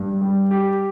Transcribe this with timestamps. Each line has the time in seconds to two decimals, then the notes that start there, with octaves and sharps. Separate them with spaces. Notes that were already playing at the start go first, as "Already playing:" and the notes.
Already playing: G2
0.21 G3
0.51 G4